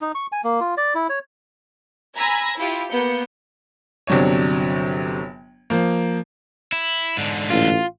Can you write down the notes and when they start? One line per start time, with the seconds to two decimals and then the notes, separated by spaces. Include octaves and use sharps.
0.01 D#4
0.15 C#6
0.32 G#5
0.44 A#3
0.61 F4
0.77 D5
0.95 E4
1.09 C#5
2.16 G#5 A#5 B5 E6 G#6 A#6
2.57 E4 F4 G4
2.89 A#3 B3 G6 C#7
4.07 G1 C3 F#3 D4 C#5
5.70 F3 A#3
6.72 E4
7.17 G#2 D3
7.50 A1 F4